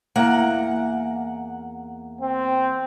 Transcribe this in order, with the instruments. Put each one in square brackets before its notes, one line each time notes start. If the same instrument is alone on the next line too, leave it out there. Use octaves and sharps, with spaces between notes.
[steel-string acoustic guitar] E2 A#3 F#5
[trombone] C4